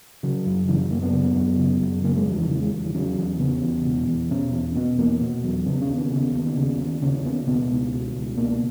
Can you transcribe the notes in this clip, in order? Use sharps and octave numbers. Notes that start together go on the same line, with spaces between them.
C#3 F#3
F#2
C#3 E3
F#2 A#3
B3
C#3
F#2
C#3
F#2
C#3 A#3
G#3
E2 F#3
E3
C#3 E3
G#3
E2
E3
C#3 F#3
E2
C#3 B3
E2
B2
E2
B2 C#4
E2
B2 B3
E2 A#3
B2
E2 F#3
C#3 B3
C#4
D#2
B3
C#3
D#2
C#3
D#2
C#3 C#4
C#4
D#2 B3
B2 B3
C#2
B2
C#2
B2 A#3